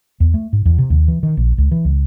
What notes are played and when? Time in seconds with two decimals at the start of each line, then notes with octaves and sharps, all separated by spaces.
0.20 E2
0.34 A3
0.53 G#2
0.66 E2
0.78 C3
0.90 D#2
1.08 E3
1.23 D#3
1.37 A#1
1.58 C#2
1.71 E3
1.85 C#2